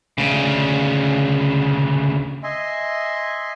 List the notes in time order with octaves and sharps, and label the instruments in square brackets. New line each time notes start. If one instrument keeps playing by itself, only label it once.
[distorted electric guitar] D2 C#3
[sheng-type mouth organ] D#5 E5 G#5 C6